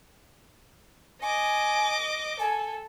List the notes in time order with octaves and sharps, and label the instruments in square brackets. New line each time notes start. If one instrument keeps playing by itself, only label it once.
[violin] D#5 D6 [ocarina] G#5
[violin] A4 [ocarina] G#5